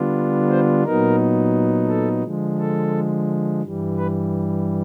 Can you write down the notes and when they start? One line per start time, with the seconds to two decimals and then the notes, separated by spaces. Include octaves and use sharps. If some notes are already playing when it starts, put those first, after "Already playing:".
Already playing: D3 G3 B3 D4 F4
0.49 C5
0.84 A#2 F#3 B3 D#4 A#4
1.88 A4
2.23 D3 F3 G#3
2.58 A4
3.62 G2 E3 G3
3.97 B4